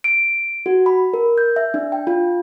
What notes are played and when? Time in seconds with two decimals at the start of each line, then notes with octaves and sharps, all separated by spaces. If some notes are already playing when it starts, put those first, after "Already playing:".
0.04 D7
0.66 F#4
0.86 B5
1.13 A#4
1.38 G6
1.56 E5
1.74 D4
1.92 G5
2.07 F4